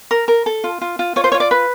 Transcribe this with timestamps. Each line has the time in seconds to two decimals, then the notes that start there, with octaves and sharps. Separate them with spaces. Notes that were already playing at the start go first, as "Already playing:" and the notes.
0.11 A#4
0.28 A#4
0.46 A4
0.64 F4
0.81 F4
0.99 F4
1.16 F4 C#5
1.24 C5
1.32 C#5
1.34 F4
1.40 D5
1.51 B4